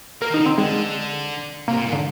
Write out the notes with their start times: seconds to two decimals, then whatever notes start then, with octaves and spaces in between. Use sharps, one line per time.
0.21 A#3 A#4
0.31 D#3
0.34 D#4
0.40 D3
0.46 C4
0.58 D3 G#3
1.68 C3 A#3
1.77 A#2
1.86 G#2
1.92 D3